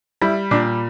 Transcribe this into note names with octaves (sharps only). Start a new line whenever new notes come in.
G3 E4
A#2 D4